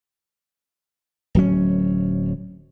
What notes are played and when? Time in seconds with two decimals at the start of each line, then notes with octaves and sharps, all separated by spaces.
1.35 D1 F#3 C#4